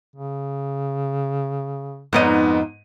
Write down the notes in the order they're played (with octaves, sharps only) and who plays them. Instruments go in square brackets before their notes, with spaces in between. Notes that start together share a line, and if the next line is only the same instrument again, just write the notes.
[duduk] C#3
[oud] F2 D#4 D#5 [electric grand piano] G#2 B3 D#7